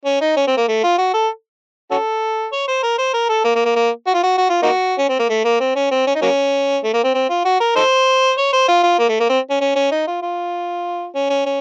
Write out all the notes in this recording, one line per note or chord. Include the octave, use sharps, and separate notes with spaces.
C#4
D#4
C#4
C4
A#3
A3
F4
F#4
A4
C#4 F#4 A4
C#5
C5
A#4
C5
A#4
A4
A#3
A#3
A#3
A#3
F#4
F4
F#4
F#4
F4
A#3 D#4 F#4
C#4
C4
A#3
A3
A#3
C4
C#4
C4
C#4
D#4
F#3 A#3 C#4
A3
A#3
C4
C4
F4
F#4
A#4
D#4 A4 C5
C#5
C5
F4
F4
A#3
A3
A#3
C4
C#4
C#4
C#4
D#4
F4
F4
C#4
C#4
C#4